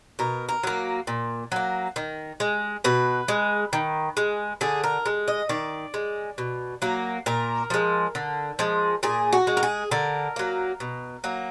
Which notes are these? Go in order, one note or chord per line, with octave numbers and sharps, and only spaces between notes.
B2 A#4
A#4
F#3 A#3
A#2
F#3 A#3
D#3
G#3
B2 B4
G#3
D#3
G#3
D3 G#4
A#4
G#3
D#5
D#3 D5
G#3
B2
F#3 A#3
A#2 A#4
F3 G#3
D3
F3 G#3
A#2 G#4
F#4
G#3
A#4
G#4
D3 A#4
F#3 A#3
B2
F#3 A#3